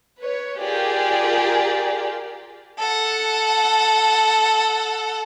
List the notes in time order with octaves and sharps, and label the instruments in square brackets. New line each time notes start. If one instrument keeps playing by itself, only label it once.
[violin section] B4 C#5
F4 G4 G#4 A#4 D5
[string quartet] A4 F#5